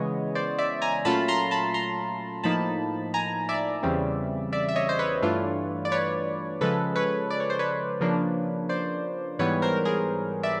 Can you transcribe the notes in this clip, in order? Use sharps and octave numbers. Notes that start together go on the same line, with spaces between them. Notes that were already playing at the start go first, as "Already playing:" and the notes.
Already playing: C#3 E3 G#3 B3 C#5 D#5
C5 D5
D5 E5
G#5 A#5
A#2 F#3 A3 C#4 F4 A5 B5
A#5 C6
A5 B5
A#5 C6
A2 F3 A#3 D#4 A5 B5
G#5 A#5
D5 E5
E2 C#3 E3 G3 C4
D5 E5
E5
C#5 D#5
C5
B4 C#5
G2 E3 A3 D4 F4
D5
B4 C#5
C#3 F3 G#3 A4 B4
B4 C#5
D5
C#5
C5
B4 C#5
C#3 F3 A#3 D4
C5 D5
G#2 E3 G3 B3 B4 C#5
A#4 C5
G#4 A#4
D5 E5